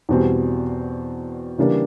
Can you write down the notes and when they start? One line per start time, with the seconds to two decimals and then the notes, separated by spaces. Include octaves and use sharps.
0.09 E2 B2 G3 C4
1.58 C#3 E3 G3 A#3 D4